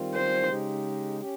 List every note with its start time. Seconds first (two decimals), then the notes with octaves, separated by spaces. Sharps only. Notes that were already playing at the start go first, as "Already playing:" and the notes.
Already playing: D#3 G3 C4 F4
0.14 C5
0.49 C#3 G#3 D#4 G4
1.21 C#4 G4